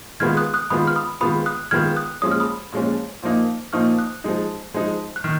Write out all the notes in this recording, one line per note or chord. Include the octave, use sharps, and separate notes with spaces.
D#3 G#3 B3 F4 F6 G#6
D#6 F#6
D#6 F#6
D#3 G#3 B3 F4 B5 D#6
F6
B5 D#6
D#3 G#3 B3 F4 B5 D#6
D#6 F#6
D#3 G#3 B3 F4 F6 G#6
D#6 F#6
A#2 F3 G#3 C#4 D#6
F6
B5 D#6
A#2 F3 G#3 C#4
A#2 F3 A#3 D#4
A#2 F3 A#3 D#4 C#6 F6
D#6 F#6
F3 G#3 D#4
F3 G#3 D#4
F#6
D#3 F6